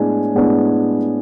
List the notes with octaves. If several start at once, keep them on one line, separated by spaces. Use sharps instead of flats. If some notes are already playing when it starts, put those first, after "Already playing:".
Already playing: A2 G#3 B3 D4 G#5
A2 G#3 B3 D4